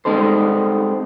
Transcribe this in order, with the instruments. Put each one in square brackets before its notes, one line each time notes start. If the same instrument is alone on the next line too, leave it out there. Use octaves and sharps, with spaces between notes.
[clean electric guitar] G3 G#3 C4 D#4 A4 C5